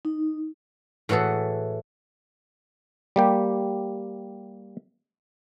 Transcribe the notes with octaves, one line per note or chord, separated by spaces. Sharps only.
D#4
A2 E3 F#4 G#4 A4
G3 A#3 G4